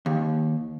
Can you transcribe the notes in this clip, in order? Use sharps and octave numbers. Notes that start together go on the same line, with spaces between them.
D#2